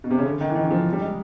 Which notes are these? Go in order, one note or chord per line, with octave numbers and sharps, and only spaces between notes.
B2
C3
C#3
D3
D#3
E3
D#3
E3
F3
G3
G#3